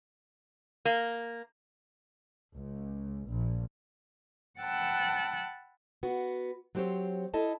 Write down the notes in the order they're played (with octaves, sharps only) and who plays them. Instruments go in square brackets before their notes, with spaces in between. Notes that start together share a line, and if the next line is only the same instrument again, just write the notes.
[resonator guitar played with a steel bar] A#3
[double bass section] C#2
A#1
[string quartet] F#5 G5 A5 B5 E6 F#6
[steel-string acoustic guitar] B3 F#4
F#3 C4 G4 C5 C#5
E4 A4 D#5 A5